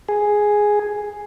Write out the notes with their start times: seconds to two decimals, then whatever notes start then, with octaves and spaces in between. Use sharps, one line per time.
0.09 G#4